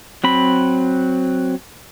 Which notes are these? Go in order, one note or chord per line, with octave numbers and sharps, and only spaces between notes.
F#3 C4 B5